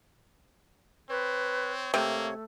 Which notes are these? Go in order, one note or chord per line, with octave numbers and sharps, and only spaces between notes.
C4 B4 C#5
C3 A3 A#3